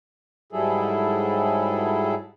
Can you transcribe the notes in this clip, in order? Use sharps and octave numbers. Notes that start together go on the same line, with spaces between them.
G#2 F#3 G3 E4 G#4 A4